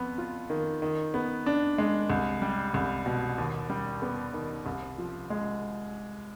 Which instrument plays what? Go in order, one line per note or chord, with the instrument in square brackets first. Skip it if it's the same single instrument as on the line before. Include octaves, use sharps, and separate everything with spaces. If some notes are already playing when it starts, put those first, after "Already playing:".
Already playing: [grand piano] F2 B3
F4
D#3
D#3
B3
D4
G#3
C2
G3
C2
B2
D#2
G3
B3
D#3
C2
F3
G#3